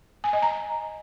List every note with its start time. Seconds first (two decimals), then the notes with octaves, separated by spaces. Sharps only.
0.24 G#5
0.33 D#5
0.42 A#5